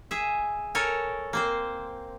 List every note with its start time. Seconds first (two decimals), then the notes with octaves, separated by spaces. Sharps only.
0.11 G#4 E5
0.75 A4 A#4 C#5 G#5
1.33 A#3 C4 C5